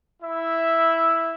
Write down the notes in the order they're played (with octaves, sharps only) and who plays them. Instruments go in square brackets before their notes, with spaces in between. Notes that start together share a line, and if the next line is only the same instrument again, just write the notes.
[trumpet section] E4 E5